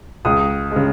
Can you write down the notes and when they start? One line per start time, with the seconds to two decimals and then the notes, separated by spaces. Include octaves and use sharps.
0.25 C#2 D#6
0.71 G#3
0.76 C#3